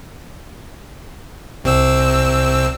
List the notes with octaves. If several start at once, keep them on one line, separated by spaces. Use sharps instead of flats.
C2 C4 E6